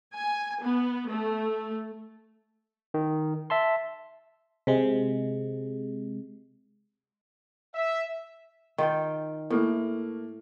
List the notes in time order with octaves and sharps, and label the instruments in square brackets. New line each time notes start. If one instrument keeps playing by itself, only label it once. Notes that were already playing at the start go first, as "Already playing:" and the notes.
[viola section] G#5
B3
A3
[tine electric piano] D#3
E5 A5 C6
[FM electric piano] C3 G#3
[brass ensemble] E5
[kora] D#3 F4 G5
[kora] A2 [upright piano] A3 A#3